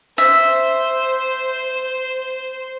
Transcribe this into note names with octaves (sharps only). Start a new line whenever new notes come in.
C5 E5